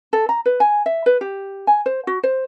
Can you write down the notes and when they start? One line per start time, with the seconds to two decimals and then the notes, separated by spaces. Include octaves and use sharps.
0.13 A4
0.29 A#5
0.46 B4
0.60 G#5
0.86 E5
1.06 B4
1.21 G4
1.67 G#5
1.86 C5
2.07 F#4
2.23 C5